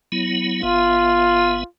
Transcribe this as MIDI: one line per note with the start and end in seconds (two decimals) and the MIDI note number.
0.12 0.62 54
0.12 0.62 59
0.12 0.62 64
0.63 1.64 31
0.63 1.64 59
0.63 1.66 65
0.63 1.64 76